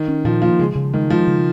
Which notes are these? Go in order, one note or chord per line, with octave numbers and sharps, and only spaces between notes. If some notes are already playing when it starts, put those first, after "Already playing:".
Already playing: D#3
C#4
A#2 F3
F3 A#3
C#3 G#3
C#3
D#3 G#3
F3 G#3
C#3